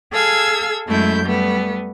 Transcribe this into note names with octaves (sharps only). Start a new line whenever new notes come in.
G#4 A4 F5 E6 G#6
F#2 G#3 A3 E4 G6
G3 A3 B3